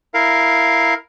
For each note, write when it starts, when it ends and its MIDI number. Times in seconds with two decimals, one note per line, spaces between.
0.14 0.94 64
0.14 0.94 70
0.14 0.94 77